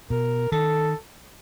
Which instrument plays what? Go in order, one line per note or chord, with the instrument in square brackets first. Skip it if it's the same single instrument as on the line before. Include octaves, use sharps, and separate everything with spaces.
[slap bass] B2 [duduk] A#4
[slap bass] D#3 [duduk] A4